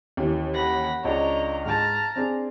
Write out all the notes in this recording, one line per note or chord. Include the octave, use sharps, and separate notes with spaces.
D#2 E3 C#4
F#5 B5 A#6
C#2 D4 C#5 D#5 A#5
G#2 A5 A#5 F6
C4 D4 G#4